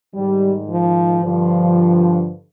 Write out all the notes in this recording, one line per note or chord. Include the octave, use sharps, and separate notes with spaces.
G#2 D#3 G3
F3
G2 D3 F3